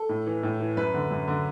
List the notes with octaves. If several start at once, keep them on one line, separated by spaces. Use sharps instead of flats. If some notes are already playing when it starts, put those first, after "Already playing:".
Already playing: A4
A2
E3
A2
E3
F#2 B4
D3
F#2
D3